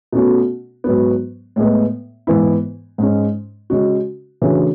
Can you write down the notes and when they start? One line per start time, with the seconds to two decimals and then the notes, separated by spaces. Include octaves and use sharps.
0.12 B2 A3 C#4 F#4
0.84 G#2 F#3 B3
1.56 A2 G#3 B3
2.27 G#2 E3 B3 E4
2.98 G#2 G#3 C#4
3.70 C#3 G#3 C#4 F#4
4.42 C#3 E3 A3 D4 F#4